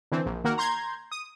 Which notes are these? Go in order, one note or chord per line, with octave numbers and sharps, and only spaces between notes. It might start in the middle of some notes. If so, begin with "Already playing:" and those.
D3 E3 C4
A#1
D#3 A#3 F#4 A#4
A#5 C6 G6 G#6
D#6